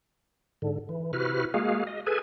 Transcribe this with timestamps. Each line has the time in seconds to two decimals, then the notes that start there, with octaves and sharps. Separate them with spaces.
0.62 G#2 D3
0.89 E3
1.13 C3 E4 F#4 B4 F6
1.54 G#3 A#3 F#4 G#4 F5
1.87 D#5
2.07 G#4 A4 B4 G#5